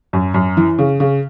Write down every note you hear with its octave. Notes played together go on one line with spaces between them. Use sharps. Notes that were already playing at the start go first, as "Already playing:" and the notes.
F#2
F#2
E3
C#3
C#3